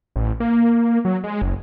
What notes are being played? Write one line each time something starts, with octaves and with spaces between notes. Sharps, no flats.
A1
A#3
F#3
G#3
F#1